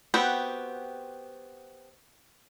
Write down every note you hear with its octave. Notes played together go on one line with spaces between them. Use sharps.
B3 C4 F#4 G4